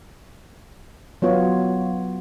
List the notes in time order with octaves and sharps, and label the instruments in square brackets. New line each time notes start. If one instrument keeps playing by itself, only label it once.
[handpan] F#3 B3 F4 C#5